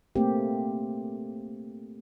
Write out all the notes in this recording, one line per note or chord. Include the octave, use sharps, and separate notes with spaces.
A3 A#3 C4 G4